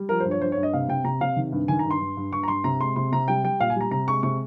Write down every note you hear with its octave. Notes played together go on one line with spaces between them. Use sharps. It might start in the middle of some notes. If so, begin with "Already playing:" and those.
Already playing: G3
F3 A#4
C5
G2
C#5
G2 C5
C#5
G2
D#5
C3 F5
C3 G5
C3 A#5
C3 F5
D#3
G2
D#3 G#5
G2 A#5
C6
G2
G2
G2 C#6
A#5
G2 C6
C3 A#5
G#3 C6
C3 C6
C3 A#5
G3 G5
G3 G5
A#2 F5
G#5
G3 A#5
C3 A#5
G#3 C#6
C3 C#6